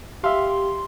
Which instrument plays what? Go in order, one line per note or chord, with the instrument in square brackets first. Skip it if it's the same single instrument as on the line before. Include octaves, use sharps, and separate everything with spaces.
[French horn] G4 [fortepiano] E5 F5 [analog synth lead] C6